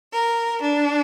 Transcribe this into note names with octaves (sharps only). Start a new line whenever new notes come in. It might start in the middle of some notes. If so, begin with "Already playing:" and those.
A#4
D4